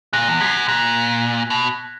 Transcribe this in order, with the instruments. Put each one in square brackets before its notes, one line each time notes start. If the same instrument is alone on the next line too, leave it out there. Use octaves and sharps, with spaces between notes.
[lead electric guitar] A#2 [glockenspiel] F#6 A#6
[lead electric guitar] E2
[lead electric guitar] F#2 [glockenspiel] G#6 B6
[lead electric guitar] A#2 [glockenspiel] F#6 A#6
[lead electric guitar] B2